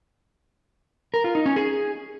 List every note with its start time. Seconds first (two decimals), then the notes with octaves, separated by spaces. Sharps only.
1.14 A#4
1.24 F4
1.35 D#4
1.46 C#4
1.56 G#4